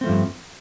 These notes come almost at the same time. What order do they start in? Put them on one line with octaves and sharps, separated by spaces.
C4 A3 F3 G2